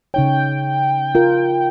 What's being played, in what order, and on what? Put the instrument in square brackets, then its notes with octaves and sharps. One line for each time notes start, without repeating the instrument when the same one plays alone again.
[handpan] C#3 D#4 C#5 [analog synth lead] G5
[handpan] F4 A#4